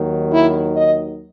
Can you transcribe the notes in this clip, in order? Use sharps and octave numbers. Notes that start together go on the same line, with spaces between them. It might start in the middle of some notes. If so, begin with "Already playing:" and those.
Already playing: D#2 D#3 F#3
E4
D#5